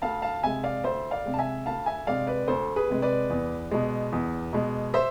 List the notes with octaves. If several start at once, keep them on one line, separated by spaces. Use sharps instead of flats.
D2 F5 A5
F5 A5
C3 G#3 E5 G#5
D5 F5
D2 C5 E5
D5 F5
C3 G#3
A5
E5 G#5
D2 F5 A5
E5 G#5
C3 G#3 D5 F5
B4 D5
D2 A4 C5
G#4 B4
C3 G#3
B4 D5
E2
B2 G#3
E2
B2 G#3
C5 E5